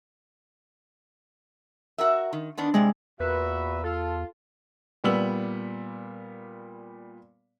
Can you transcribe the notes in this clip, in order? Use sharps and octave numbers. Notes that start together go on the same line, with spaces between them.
F#4 A#4 E5
D#3
D#3 B3 D4
G2 C3 G#3 D5
E2 A#2 F#4 B4 E5
F4 A4
A#2 G3 B3 E6 F#7